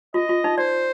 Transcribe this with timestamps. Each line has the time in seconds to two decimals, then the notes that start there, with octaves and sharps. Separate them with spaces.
0.14 F4 D#5
0.29 F4
0.44 D#4
0.58 C5 D5